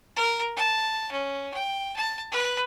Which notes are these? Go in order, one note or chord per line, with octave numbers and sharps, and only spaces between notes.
A#4
A5
C#4
G5
A5
B4